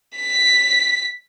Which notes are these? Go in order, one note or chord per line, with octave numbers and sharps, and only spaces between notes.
B6